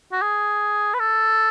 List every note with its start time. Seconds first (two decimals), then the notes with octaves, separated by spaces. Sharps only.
0.12 F#4
0.22 G#4
0.94 B4
0.99 A4